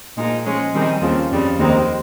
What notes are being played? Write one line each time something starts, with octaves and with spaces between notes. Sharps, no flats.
A#2 F3 G#3 D#4
F3 G#3 C#4 G#4
D#3 G3 C4 D#4 G#4
D#2 C#3 F3 C4
F2 C#3 G3
D#2 D#3 G#3 C4 D#4